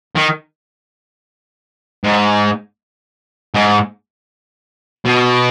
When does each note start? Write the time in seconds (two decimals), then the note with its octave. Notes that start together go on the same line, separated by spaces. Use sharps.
0.15 D#3
2.04 G#2
3.54 G#2
5.05 B2